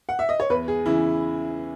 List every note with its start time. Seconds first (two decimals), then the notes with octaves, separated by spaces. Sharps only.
0.09 F#5
0.19 E5
0.29 D#5
0.40 C#5
0.50 E2 B4
0.68 G#4
0.86 C#3 E3 E4